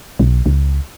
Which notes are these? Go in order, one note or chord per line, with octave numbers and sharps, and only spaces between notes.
B1
C#2